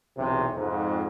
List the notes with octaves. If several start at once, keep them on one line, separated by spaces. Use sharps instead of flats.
B1 E2 C3
F2 G#2